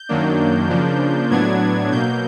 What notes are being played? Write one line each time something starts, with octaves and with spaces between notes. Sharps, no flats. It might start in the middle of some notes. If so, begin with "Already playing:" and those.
Already playing: G6
F#2 D#3 F#3 A#3 D4
C#3 F3 A#3 D4
A2 F#3 B3 D4 G#6
B2 F#3 A#3 G6